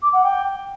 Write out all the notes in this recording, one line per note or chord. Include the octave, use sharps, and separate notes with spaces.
D6
F#5
G5